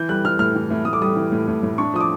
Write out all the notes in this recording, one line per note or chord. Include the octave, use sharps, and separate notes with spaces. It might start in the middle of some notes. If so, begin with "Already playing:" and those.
Already playing: E3 G6
G3 F#6
E3 F6
A2 F6
E3
A2
A2 D#6
D6
G3 D#6
E3
A2
A2
A2
D4 C#6
F3 D#6
D6